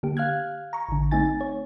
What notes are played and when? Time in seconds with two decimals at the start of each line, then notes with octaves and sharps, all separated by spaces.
0.03 D3 A#3 G4
0.17 F5 F6 F#6 G#6
0.73 A#5 C#6
0.89 A1 D3
1.11 A3 C4 D#4 G#5 A6
1.41 C#5